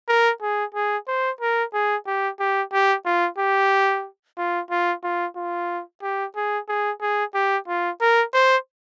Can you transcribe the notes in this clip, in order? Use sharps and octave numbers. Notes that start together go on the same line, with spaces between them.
A#4
G#4
G#4
C5
A#4
G#4
G4
G4
G4
F4
G4
F4
F4
F4
F4
G4
G#4
G#4
G#4
G4
F4
A#4
C5